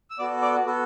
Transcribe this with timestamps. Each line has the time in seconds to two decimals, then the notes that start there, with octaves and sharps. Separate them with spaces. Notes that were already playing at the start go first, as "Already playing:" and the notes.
0.10 E6
0.19 B3 F#4 A4 D5 D6
0.42 D5 D6
0.65 B3 F#4 A4